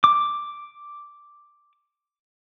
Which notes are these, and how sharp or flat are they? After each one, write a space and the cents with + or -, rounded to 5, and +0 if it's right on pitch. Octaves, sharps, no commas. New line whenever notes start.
D6 +0